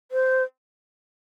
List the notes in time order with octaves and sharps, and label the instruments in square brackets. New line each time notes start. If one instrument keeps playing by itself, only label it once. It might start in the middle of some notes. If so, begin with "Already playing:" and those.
[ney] C5